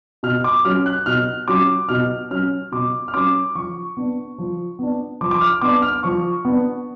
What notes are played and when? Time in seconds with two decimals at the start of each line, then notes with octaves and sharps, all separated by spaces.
0.23 B2 F6
0.44 D6
0.64 F#3 C#4 F6
0.86 F#6
1.06 B2 F6
1.48 F#3 C#4 D6
1.89 B2 F6
2.30 F#3 C#4 F6
2.72 B2 D6
3.08 F6
3.14 F#3 C#4 D6
3.55 F3 C#6
3.97 B3 D4
4.38 F3
4.79 B3 D4
5.21 F3 D6
5.31 D6
5.41 F6
5.61 B3 D4 D6
5.82 F6
6.03 F3 C#6
6.45 B3 D4